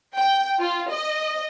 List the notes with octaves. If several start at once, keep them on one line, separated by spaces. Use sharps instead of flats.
G5
F4
D#5